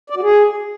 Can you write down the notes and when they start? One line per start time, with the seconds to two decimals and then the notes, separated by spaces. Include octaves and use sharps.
0.10 D5
0.16 F#4
0.23 G#4